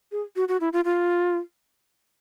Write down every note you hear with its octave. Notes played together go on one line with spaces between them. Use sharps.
G#4
F#4
F#4
E4
F4
F4